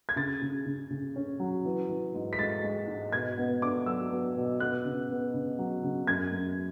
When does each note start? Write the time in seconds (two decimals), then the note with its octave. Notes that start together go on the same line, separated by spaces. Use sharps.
0.09 G#6
0.16 C#3 A6
0.42 C#3
0.66 C#3
0.91 C#3
1.16 C#4
1.40 F#3
1.65 E3
1.89 E3
2.14 G#2
2.33 B6
2.39 G#3 A6
2.63 G#3
2.87 G#2
3.12 B2 G#6
3.38 B3
3.62 D4 D6
3.86 F#3 E6
4.10 B3
4.36 B2
4.60 B3 F#6
4.85 C#3
5.10 B3
5.34 C#3
5.59 F#3
5.83 C#3
6.07 F#2 G#6
6.32 F#2